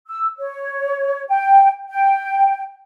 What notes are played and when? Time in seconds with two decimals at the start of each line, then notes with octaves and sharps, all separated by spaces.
0.08 E6
0.38 C#5
1.29 G5
1.90 G5